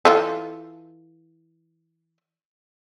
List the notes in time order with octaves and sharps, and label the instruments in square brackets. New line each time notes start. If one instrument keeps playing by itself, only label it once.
[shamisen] E3 F4 A4